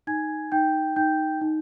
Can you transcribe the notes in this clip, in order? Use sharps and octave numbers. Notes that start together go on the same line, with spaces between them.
D#4 G#5 G#6
D#4 G5 G6
D#4 G5 G6
D#4